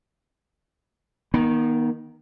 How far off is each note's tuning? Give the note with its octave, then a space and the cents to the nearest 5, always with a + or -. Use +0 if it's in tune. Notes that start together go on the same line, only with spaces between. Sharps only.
D#3 +0 B3 -45